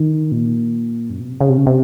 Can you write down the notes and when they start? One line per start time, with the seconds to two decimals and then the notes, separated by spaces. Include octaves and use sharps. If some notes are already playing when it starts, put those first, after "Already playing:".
Already playing: D#3
0.32 A#2
1.10 F#2
1.20 B2
1.29 C3
1.41 C#3
1.50 C3
1.58 C#3
1.67 C3